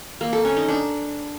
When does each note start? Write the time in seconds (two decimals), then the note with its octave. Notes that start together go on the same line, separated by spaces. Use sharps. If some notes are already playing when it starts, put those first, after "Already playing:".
0.21 A#3
0.33 A4
0.45 C#4
0.57 D#4
0.68 D4